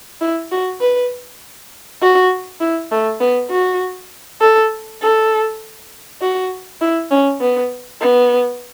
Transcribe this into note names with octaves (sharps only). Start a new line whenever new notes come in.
E4
F#4
B4
F#4
E4
A3
B3
F#4
A4
A4
F#4
E4
C#4
B3
B3